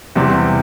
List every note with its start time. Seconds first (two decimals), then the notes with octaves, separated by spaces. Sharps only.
0.16 E2 C3 G3 C4